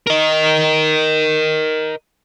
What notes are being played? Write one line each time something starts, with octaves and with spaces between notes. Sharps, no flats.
A#4 D#5